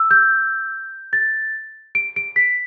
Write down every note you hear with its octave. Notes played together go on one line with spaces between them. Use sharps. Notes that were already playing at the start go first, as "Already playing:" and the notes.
Already playing: E6
G6
A6
D7
D7
B6